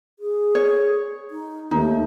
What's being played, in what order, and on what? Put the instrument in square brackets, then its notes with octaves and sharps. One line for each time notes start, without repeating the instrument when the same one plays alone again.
[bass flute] G#4
[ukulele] C#5
[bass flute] D#4
[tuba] D#2 [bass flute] A3 [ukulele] D#4